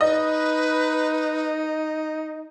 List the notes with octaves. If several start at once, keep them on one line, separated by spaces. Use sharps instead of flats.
D#4 B4 D#5